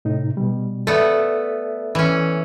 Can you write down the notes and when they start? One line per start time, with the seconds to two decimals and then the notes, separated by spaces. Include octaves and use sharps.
0.05 A2 C3 D#4
0.37 B2 G3
0.87 A3 B3 A4 D5 E5
1.95 E3 C#4